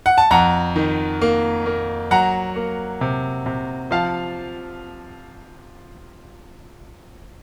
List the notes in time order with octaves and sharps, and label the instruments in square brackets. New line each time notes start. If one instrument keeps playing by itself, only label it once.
[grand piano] F#5
A5
F2 F#5 A#5
D#3
A#3
A#3
F#3 F#5 A#5
A#3
C3
C3
F3 F5 A5